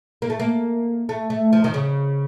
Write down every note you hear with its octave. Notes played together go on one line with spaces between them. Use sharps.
A#3
A3
A#3
A3
A3
F3
D#3
C#3